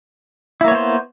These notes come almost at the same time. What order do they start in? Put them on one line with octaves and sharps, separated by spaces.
E4 A#3 C#5 B3 C5